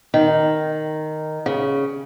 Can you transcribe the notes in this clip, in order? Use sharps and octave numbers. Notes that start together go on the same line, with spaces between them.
D#3
C#3